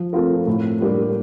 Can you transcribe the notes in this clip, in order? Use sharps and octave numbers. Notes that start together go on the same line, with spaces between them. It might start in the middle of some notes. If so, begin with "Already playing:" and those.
Already playing: F3
A3 C4 F4 A#4
A2
G3 A#3 D4 G4